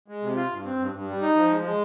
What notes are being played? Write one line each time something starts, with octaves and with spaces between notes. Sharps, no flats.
G#3
C3
F4
G2
C4
G2
G2
G3
D#4
F3
G#3
G#3